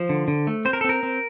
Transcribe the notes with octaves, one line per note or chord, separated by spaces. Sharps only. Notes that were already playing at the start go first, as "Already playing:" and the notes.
Already playing: F3 C5
D3
D3
A3
C4 C5
A#4
A4
C4 A#4
C4